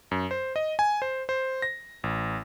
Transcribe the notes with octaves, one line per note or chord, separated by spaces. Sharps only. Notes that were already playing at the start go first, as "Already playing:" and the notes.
F#2
C5
D#5
G#5
C5
C5
A#6
A1